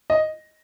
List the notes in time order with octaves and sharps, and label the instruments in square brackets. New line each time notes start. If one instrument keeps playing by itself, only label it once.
[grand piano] D#5